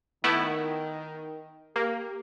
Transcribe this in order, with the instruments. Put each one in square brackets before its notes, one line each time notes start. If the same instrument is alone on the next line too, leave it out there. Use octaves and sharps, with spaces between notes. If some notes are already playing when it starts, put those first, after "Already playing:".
[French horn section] D#3 [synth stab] A3 B3 E4
[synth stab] A#3 [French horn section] G4